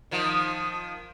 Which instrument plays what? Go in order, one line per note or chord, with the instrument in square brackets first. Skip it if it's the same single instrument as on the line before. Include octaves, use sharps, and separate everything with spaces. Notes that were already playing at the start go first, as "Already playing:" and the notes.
[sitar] D#3 F3